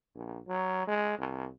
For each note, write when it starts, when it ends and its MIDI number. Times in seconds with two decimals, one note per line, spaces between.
0.15 0.39 34
0.48 0.82 54
0.87 1.17 56
1.19 1.48 36